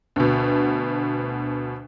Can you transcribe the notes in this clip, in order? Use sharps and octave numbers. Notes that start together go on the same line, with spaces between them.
D2 B2